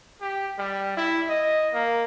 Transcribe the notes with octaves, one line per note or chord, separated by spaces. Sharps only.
G4
G3
E4
D#5
A#3